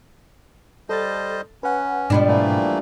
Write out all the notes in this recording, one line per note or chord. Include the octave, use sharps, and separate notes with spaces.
G3 A4 C5 D#5 A6
C#4 B4 F#5
G#2 B2 F3 G3 D4 B5
E3 A3 A#3